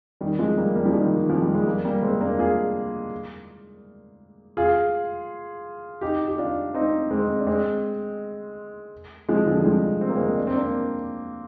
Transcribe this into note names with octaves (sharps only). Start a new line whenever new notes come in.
D#3 G3
F3 G#3
G3 A#3
G3 A#3
F3
D#3 G3
D#3
F3
G3
G#3
G3 A#3
G3 A#3
G#3 C4
A#3 D4
F4 G#4
F4 G#4
D#4 G4
G4
D4 F4
C4 D#4
G#3 C4
D4
G#3 C4
F3 G#3
D3 F3
G3
F3 G#3
C4
A#3
G#3 C4
D4
C4
A#3 D4